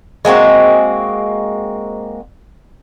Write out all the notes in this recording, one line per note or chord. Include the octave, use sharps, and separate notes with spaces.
G#3 A#3 C4 F#4